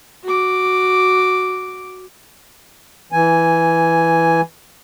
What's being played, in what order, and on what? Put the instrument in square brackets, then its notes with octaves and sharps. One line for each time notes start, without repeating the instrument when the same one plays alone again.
[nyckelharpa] F#4 D6
[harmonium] E3 G#5